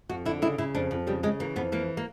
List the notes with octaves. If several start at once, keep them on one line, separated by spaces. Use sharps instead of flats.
F2 F#4
D3 E4
C#3 E4
C#3 E4
F2 D4
F2
C#3 G3
C#3 G#3
E3 A#3
F2 B3
E3 A#3
A#3